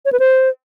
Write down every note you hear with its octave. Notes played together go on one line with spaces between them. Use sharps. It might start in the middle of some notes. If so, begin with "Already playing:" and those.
C#5
B4
C5